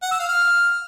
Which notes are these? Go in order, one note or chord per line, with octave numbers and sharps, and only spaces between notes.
F#5
E6
F5
F6